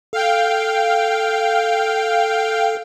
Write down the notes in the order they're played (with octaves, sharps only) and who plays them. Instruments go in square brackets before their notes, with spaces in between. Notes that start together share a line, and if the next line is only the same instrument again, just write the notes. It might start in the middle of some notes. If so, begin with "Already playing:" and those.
[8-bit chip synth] A4 [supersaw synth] F5 G5